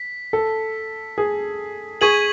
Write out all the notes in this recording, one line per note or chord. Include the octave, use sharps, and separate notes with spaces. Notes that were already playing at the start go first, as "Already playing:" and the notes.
Already playing: B6
A4
G#4
G#4 C#6 G#6 B6 D#7 F#7